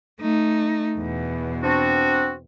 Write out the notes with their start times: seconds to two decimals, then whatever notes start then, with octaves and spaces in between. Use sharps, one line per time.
0.20 A3 D#4
0.98 E2 B2
1.63 C4 D4 F#4